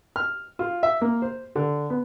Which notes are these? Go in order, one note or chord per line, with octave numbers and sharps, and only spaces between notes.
F6
F4
E5
A#3
C5
D3
B3